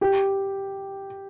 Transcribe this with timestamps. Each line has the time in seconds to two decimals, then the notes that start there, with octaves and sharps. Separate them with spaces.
0.01 G4